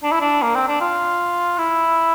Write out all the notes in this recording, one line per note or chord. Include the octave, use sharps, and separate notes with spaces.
D4
E4
D4
A#3
C4
D4
F4
E4